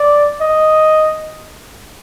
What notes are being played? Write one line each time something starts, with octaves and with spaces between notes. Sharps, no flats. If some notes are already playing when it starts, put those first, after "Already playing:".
Already playing: D5
D#5